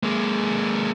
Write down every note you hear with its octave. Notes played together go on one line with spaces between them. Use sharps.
G#3 A#3